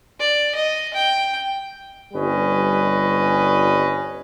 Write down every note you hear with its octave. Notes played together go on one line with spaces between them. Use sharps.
D5
D#5
G5
G1 G3 C#4 B4 D#5